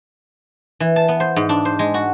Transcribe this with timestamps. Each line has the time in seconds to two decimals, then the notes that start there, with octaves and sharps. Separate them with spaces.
0.80 E3
0.96 A5
1.08 B3
1.20 C5
1.36 G#2
1.49 D4
1.65 C5
1.79 G#3
1.94 F#4